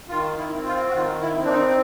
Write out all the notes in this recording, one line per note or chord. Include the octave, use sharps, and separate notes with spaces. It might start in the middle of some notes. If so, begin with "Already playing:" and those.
D#3 F4
E4
C4
F4
F#4
D#3 F4
E4
C4
D4
D#4